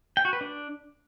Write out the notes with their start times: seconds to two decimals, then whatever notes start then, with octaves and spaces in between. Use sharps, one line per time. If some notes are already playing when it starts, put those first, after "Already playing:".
0.17 G5
0.25 F#4
0.33 B4
0.41 D4